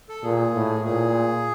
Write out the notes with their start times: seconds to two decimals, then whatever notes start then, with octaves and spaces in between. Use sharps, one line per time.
0.09 A4
0.23 A#2 G#4
0.54 A2
0.84 A#2 G#4